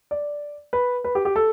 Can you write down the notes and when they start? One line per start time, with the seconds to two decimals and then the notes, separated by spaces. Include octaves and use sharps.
0.11 D5
0.73 B4
1.04 B4
1.15 G4
1.25 G4
1.36 A4